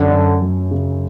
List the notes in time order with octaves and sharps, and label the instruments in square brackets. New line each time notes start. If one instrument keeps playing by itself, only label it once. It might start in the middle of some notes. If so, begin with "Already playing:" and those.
Already playing: [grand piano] F#2 [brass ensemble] D3
[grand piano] F#2
F#3
C#3